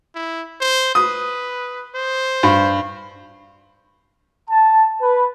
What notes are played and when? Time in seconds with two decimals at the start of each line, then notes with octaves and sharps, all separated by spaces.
0.15 E4
0.61 C5
0.95 B4 D#6
1.95 C5
2.43 G2
4.50 A5
5.02 B4